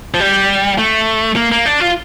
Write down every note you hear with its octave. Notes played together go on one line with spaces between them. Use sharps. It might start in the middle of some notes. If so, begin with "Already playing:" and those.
F3
G3
A3
A#3
A#3
D4
F4